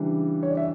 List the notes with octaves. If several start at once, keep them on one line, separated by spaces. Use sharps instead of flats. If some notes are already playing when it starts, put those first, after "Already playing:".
Already playing: C#3 E3 G3 D4
C#5
D5
E5